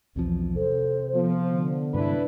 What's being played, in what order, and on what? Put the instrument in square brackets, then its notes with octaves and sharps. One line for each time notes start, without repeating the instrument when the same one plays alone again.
[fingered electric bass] B1 E2 F3 [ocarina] C4
[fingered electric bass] C3 [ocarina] A4 [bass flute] C5
[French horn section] F3 [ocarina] B3
[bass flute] D3
[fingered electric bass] G2 C3 G#3 [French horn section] D4 E4 B4